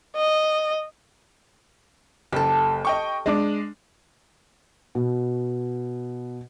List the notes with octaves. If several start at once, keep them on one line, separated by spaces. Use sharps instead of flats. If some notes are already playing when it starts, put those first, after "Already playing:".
D#5
F#1 G4 A4
D#5 G5 C#6
G#3 D4 D6
B2